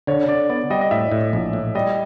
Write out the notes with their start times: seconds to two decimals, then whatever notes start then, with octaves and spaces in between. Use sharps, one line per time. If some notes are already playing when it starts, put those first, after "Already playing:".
0.07 D3 C#5
0.28 D3 D5
0.50 B3 D5
0.70 G3 D#5
0.81 D#5
0.91 A2 E5
1.12 A2
1.33 A#1
1.53 A2
1.75 G3 D#5